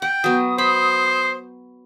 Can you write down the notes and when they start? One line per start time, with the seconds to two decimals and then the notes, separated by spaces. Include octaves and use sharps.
0.02 F#5 G5
0.24 F#3 B3 D#6
0.58 C5 B5